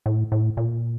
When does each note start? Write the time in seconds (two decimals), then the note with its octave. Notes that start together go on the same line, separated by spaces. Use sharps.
0.06 A2
0.32 A2
0.57 A#2